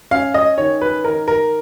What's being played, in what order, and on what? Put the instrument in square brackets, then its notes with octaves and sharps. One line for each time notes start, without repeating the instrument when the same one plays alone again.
[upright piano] C#4 F5
D#5
D#3 C#5
B4
D#3 A#4
A#4